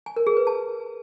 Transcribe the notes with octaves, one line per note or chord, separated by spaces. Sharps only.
G#5
A#4
G#4
B4
A5